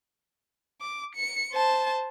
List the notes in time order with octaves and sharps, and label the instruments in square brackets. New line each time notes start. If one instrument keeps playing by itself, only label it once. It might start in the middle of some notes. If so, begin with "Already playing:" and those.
[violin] D6
C#7
C5 A5